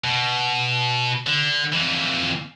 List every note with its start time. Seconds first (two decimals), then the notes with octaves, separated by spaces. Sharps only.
0.04 B2
1.27 D3
1.72 F2 E3